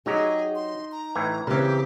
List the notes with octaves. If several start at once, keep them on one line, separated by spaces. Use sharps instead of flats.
F#3 D#4 G4 G#4 A#5
C6
A#5
A2 E3 G#5
C#3 E3 C4 G4 A#4